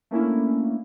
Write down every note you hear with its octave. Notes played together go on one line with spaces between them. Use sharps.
A3 A#3 C#4 D4 E4